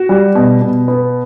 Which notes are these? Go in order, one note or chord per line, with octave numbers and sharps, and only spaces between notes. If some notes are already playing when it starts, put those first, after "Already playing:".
Already playing: F#4
G3
B2
B2
B3